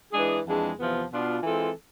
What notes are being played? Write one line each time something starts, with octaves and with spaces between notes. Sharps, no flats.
E3 G#3 D4 G#4
F2 E3 G#3 D4
E2 C3 F3 B3 F4
B2 B3 D4 F4
E3 G#3 C4 F4 A4